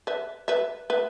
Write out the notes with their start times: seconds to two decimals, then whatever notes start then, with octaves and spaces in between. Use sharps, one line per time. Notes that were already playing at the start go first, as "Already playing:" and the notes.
0.07 B4 E5
0.48 B4 E5
0.90 B4 E5